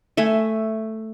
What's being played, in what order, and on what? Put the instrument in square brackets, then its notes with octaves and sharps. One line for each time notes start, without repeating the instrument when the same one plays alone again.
[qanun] A3 E5 G#5